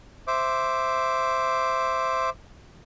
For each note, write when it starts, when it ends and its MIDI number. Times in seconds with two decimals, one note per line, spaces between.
0.28 2.30 72
0.28 2.30 76
0.28 2.30 86